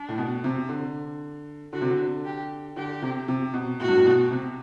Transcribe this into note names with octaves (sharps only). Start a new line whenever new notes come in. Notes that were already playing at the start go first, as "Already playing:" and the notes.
Already playing: D4
A2
B2
C3
D3
D3 F#4
C3
D3
G4
D3 G4
C3
C3
B2
A2 F#4
G2
A2
B2
C3